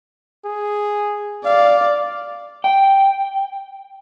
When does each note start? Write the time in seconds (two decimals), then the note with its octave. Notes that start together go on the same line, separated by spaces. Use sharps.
0.45 G#4
1.45 D5 F5
2.64 G5